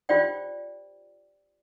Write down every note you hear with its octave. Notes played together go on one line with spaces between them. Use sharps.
F4 G4 C5 D5 G5